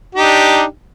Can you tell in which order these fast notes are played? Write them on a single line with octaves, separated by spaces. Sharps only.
G4 D#4 D4